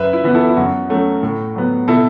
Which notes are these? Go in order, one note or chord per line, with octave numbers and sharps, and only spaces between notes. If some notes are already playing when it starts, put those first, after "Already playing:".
Already playing: F#2 B4 E5
E4
E3 B3
E4 A4
E4
F#2 F#4
F#3 A3 C#4
A2
F#3 B3
B2 E4 A4